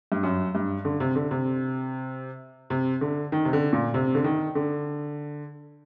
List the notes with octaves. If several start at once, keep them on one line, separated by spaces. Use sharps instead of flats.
G2
F#2
G2
D3
C3
D3
C3
C3
D3
D#3
C3
D3
A#2
C3
D3
D#3
D3